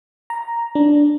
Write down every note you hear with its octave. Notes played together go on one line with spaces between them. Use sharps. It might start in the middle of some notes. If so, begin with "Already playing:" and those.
A#5
D4